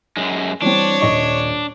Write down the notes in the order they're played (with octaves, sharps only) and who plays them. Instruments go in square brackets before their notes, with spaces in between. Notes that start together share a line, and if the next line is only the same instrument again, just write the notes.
[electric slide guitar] F#2 G#3
[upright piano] E3 G3 C4 [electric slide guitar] D4 [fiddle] C#5
[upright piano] D#1 D#5 C#6